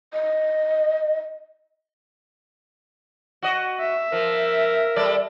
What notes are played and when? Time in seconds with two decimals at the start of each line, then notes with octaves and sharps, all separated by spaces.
0.13 D#5
3.42 F#4 D#5
3.80 E5
4.12 F3 A#4
4.96 G3 A4 D5